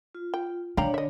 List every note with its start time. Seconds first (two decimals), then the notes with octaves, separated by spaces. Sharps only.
0.15 F4
0.34 G5
0.77 D3 D4 C#5 D5 F5 G5 A#5
0.94 D#5 E5